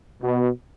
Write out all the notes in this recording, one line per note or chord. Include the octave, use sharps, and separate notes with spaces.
B2